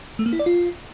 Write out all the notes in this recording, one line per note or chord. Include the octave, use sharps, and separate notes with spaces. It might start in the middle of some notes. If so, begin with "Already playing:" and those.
A3
A#3
E4
D5
F4